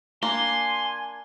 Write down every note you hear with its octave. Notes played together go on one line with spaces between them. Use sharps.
A#3 D4 G#5 C6